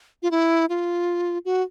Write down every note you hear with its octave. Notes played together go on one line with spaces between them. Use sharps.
F4
E4
F4
F#4